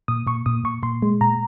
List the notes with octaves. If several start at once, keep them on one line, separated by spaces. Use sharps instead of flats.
A#2 D#6
A#2 C#6
A#2 D#6
A#2 C#6
A#2 C6
G#3
A#2 A#5